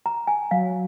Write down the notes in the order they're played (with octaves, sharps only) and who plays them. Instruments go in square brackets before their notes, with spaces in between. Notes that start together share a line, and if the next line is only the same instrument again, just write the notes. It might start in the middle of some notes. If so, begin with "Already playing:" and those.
[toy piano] A#5
G#5
[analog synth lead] F#3 [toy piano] F5